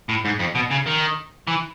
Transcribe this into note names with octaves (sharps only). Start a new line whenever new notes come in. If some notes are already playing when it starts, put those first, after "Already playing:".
A2
G#2
F2
B2
C#3
D#3
E3